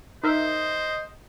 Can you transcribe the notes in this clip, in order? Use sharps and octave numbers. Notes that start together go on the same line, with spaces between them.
D#4 A#4 C5 D#5 E5